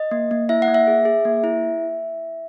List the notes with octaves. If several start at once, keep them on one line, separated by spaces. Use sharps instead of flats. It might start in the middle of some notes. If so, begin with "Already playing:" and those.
Already playing: D#5
A#3
A#3
E4 E5
F#5
A#3
E5
G#4
G#4
A#3
E4